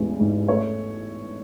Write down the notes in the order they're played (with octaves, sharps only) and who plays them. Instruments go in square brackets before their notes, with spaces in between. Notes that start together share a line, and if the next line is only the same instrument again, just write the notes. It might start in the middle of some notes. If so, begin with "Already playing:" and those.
Already playing: [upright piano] A1 E2 G#3
G#2
A3 C#5